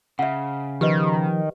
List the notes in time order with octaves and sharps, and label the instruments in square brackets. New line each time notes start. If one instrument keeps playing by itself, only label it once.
[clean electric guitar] C#3 [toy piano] E5 F#5
[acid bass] D#3 [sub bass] F3 [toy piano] G4 B4 D#5